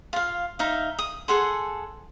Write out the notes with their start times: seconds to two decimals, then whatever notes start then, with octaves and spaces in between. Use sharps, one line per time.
0.13 F4 F5
0.59 D#4 E5 F5
0.99 D#6
1.28 G#4 A4 F#5 C6